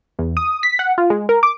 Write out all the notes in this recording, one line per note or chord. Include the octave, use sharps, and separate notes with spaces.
E2
D#6
B6
F#5
F4
G#3
A#4
D6